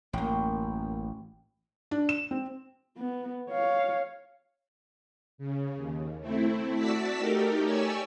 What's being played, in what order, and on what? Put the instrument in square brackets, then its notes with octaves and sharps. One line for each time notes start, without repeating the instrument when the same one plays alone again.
[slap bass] A1 [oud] F#2 A#3 [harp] G5
[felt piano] D4
E7
C4
[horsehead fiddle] B3
C#5 F5
[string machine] C#3
D#2
A3 C4 E4
F#4 D5 A5 E6 B6
A3 D#4 G4 A4 A#4
G4 C#5 D5 G#5 E6